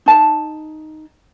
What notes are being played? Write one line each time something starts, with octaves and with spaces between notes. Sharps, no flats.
D#4 A5